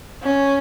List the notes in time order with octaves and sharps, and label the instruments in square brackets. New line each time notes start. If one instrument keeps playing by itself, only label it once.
[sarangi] C#4